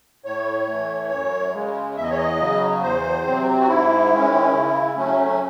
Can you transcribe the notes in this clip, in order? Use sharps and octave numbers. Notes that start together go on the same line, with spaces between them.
A2 C#5
E3 A3
F#2
C#3 G#3
E2 E5
D#5
C#5
D#5
C#3 F#3
E2 C5
C3 F#3 C4
F#4
G#2 E4
D#3 G#3 C#4
C#3
F#3 A3 C#4